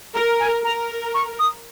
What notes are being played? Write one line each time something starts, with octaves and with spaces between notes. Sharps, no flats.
A#4 A#5
G#5
A#4 A#5
C#6
D#6